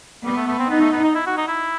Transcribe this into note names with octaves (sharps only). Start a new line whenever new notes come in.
G3 B3
A3
A3
C4
B3 D#4
A3
B3
D#4
E4
F#4
D#4
E4